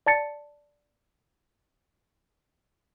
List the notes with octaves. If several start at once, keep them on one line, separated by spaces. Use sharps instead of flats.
D5 A5 A6 C#7